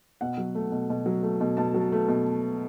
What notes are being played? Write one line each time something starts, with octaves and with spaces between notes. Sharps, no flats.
B2 F#5
F#3
A3
B2
B2
F#3
A3
B2
B2 A5
F#3
A3
B2